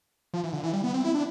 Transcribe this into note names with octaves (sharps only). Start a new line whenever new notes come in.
F3
E3
D3
E3
G3
B3
C4
E4
D4